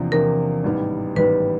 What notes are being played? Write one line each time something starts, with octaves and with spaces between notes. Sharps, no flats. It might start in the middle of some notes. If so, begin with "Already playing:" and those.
Already playing: E2 C3 F3 A#3 D4
E2 C3 F3 A#3 D4 A#4
A1 G#2 D#3 G3 B3
A1 G#2 D#3 G3 B3 B4